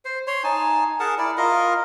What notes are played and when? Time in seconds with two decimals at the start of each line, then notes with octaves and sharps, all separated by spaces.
0.05 C5
0.27 C#5 C6
0.44 D#4 G#5 A5
1.00 G#4 A#4 F#5 A5
1.18 E4 D5
1.37 F4 A#4 D#5